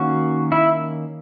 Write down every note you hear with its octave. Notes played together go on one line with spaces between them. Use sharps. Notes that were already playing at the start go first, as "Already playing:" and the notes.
Already playing: D#3 A#3 C#4 F#4
E4